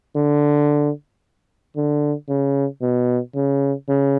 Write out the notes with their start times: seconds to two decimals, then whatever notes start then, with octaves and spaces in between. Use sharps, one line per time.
0.15 D3
1.76 D3
2.29 C#3
2.82 B2
3.35 C#3
3.89 C#3